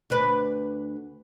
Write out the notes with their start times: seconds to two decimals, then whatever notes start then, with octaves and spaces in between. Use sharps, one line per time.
0.10 D2 D4 B4